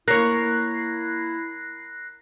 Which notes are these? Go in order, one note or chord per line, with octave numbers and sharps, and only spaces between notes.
A#3 E4 A#4 C#5 F#6 A#6 C7